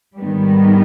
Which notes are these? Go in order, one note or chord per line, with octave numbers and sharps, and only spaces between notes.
G#2 D#3 G3 B3